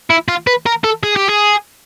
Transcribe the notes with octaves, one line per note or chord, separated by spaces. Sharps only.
E4
F4
B4
A#4
A4
G#4
G4
G#4